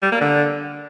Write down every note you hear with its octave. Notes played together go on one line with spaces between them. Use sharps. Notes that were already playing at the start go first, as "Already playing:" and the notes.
G3
A#3
D3